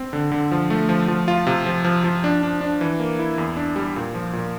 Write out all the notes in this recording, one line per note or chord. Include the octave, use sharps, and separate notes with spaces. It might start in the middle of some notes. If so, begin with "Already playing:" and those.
Already playing: C4
D3
D3
F3
A3
F3
F3
F4
C3
F3
F3
F3
D4
D4
D4
E3
A#3
E4
E2
D4
G3
A#2
F3
A#2